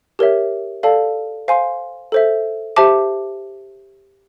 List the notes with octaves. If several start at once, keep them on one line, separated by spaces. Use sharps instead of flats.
G4 A#4 C#5 E5
A4 D5 F5 A5
C5 F5 G#5 C6
A4 C5 E5
G4 C5 E5 A5 D6